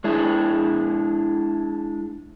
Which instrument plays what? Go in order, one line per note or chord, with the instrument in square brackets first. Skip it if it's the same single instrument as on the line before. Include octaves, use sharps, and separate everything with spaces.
[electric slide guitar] G#3 D4 E4